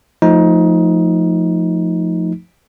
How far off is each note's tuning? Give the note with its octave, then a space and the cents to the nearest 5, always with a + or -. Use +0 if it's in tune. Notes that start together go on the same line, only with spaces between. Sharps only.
F3 +10 A3 +0 D#4 +20